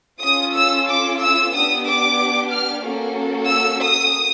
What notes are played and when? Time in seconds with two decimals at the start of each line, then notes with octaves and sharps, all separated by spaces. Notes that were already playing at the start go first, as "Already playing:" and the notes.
0.21 C#4 F4 A4 D#6
0.54 E6
0.88 D6
1.19 E6
1.52 B3 D4 G4 D#6
1.85 D6
2.51 F6
2.84 A#3 C#4 F#4 A4
3.50 E6
3.82 D#6